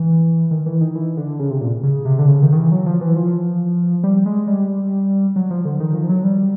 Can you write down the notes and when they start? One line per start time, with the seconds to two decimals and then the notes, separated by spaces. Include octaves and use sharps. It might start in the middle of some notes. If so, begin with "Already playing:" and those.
Already playing: E3
0.51 D#3
0.66 E3
0.81 D#3
0.95 E3
1.17 D3
1.39 C#3
1.50 C3
1.61 A#2
1.83 C#3
2.05 C3
2.19 D3
2.28 C#3
2.42 D#3
2.52 D#3
2.57 E3
2.72 F#3
2.86 F3
3.01 E3
3.16 F3
4.04 G3
4.26 G#3
4.47 G3
5.36 F#3
5.50 F3
5.65 D3
5.80 D#3
5.94 F3
6.09 F#3
6.24 G3